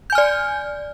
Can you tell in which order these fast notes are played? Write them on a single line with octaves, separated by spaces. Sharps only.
G6 G#5 F6 D5